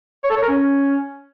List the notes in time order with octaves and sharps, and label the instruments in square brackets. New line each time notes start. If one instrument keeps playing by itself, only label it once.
[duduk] C#5
A4
C#5
A#4
C#4